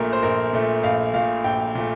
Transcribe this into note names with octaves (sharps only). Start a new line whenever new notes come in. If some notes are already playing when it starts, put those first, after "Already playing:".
Already playing: A#1 A#2 A3 A#4
C5
A#1 A#4
A#2 A3
A#1 F5
A#2 A3 F5
A#1 G5
A#2 A3